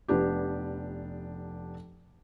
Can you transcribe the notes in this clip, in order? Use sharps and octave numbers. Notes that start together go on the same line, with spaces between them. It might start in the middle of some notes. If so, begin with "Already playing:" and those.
F1 B3 D4 G4